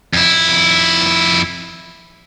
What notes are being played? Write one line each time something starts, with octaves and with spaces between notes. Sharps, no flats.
F2 E4